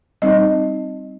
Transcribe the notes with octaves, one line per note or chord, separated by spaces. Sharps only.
G3 C4 D#4 D#5